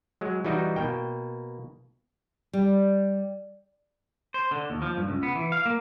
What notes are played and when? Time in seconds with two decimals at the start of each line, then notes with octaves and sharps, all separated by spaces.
0.21 F#3 G#3
0.45 E3 G3 D#4 F#4 D#5
0.76 B2 A#3 G5
2.53 G3
4.34 C5
4.51 D3
4.70 D#2
4.82 F3
4.97 G2
5.09 C#2
5.23 B3
5.35 E3
5.52 F5
5.66 A#3